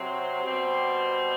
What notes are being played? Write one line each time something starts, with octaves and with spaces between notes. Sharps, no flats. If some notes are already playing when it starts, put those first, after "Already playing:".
Already playing: C3 F#3 C4
B2 G3 C4